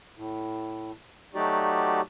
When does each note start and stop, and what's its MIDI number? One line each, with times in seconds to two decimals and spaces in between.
0.16 0.92 45
1.35 2.01 54
1.35 2.01 57
1.35 2.01 63
1.35 2.01 66
1.35 2.01 67
1.35 2.01 74